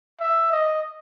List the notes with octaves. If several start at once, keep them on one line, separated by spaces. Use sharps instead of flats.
E5
D#5